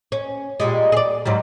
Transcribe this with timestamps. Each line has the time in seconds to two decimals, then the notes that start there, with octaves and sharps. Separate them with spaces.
0.12 C#4
0.60 A#2 G3 G#3
0.92 G#4 D5
1.26 G#2 F#3 G3